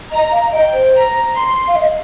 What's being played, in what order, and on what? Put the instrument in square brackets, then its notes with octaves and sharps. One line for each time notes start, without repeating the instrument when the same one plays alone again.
[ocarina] D#5 [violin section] A#5
[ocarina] F5
[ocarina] D#5 [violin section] G5
[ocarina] C5
[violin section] A#5
C6
[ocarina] F5
D#5